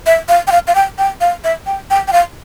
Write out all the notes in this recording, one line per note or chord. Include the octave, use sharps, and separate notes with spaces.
E5
F5
G5
F5
F5
G5
G5
F5
E5
G5
G5
G5
F5